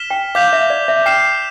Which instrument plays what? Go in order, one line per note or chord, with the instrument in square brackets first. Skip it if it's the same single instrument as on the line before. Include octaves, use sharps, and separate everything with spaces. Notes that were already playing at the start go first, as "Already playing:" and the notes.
Already playing: [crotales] F6 B6 E7 G7
[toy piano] G5
[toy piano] F5 [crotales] D6 G6 B6 F7
[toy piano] E5
D5
E5
[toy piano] G5 [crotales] F6 C7 E7